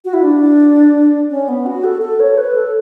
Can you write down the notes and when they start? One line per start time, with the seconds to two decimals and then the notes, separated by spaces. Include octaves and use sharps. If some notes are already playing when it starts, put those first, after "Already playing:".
0.05 F#4
0.14 E4
0.23 D4
1.30 C#4
1.48 B3
1.66 F#4
1.84 A4
2.02 A4
2.20 C#5
2.38 B4
2.55 A4